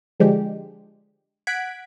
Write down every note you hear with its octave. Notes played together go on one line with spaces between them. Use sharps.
D3 F3 G#3 D4 G4
F#5 F#6 G#6 B6 D7